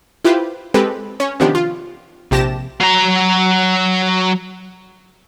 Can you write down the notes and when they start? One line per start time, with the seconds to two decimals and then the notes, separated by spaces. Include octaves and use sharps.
0.25 E4 F4 G4 B4 C5
0.74 G#3 C4 G4 A4 B4
1.20 C#4 C#5
1.40 C3 D#3 F3 B3 D4 G4
1.55 F4
2.31 A#1 C3 G4 A5 A#6 E7
2.81 F#3 A#5